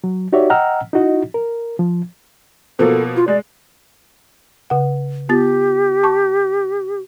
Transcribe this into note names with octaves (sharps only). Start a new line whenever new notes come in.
F#3
D#4 F#4 G4 C#5 D5 E5
D#5 F#5 G5 A#5 E6 F6
D#4 E4 F#4 D#5
A#4
F3
B2 F3 A#3 A4
F4
G#3 D5
C#3 F#5
B3 F4 G4 A6
A5 C#6 D6